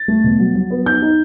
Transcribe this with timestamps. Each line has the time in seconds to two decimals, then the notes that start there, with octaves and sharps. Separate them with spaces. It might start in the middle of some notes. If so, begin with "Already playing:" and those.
Already playing: A6
0.08 A3
0.24 B2
0.40 F#3
0.55 F#3
0.71 B3
0.86 D#4 G6
1.02 D#4